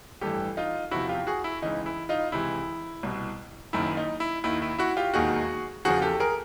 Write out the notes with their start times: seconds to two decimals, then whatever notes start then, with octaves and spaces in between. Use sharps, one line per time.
0.21 A1 G2 E3 G4 A4
0.57 D#4 F4
0.91 E2 C3 F3 E4 F#4
1.09 F4 G4
1.27 F#4 G#4
1.44 E4
1.62 C#2 C#3 E3 D#4
1.86 E4
2.09 D#4 F4
2.32 C#2 C3 E3 E4
3.03 C2 B2
3.73 F#1 F#2 D#3 E4
3.97 D#4
4.20 E4
4.44 D#2 D#3 E4
4.62 E4
4.78 E4 F#4
4.97 F4 G4
5.14 E1 D#2 D#3 F#4 G#4
5.85 E2 C#3 F3 F#4 G#4
6.02 G4 A4
6.20 G#4 A#4